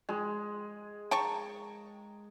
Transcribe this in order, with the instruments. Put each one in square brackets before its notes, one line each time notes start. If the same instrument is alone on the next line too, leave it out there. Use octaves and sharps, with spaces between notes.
[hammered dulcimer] G#3
[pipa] G5 A5 C#6 [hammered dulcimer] A#5